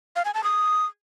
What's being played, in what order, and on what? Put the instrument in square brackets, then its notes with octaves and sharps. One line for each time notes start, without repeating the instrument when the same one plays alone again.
[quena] F5
G#5
A5
D#6